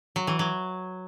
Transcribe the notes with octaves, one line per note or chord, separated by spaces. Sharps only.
F#3
E3
F#3